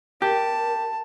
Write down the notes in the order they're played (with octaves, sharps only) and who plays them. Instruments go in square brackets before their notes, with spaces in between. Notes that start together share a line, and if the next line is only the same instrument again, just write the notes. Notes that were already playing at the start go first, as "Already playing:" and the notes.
[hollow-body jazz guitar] G4 [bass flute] A#4 [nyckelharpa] A5